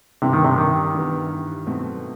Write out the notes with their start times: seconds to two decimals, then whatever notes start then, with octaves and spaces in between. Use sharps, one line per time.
0.22 G2 C3 E3 B3
0.33 D#3
0.44 C3
0.58 D#3
0.94 G2 E3 B3
1.67 B2 F#3 A3 C4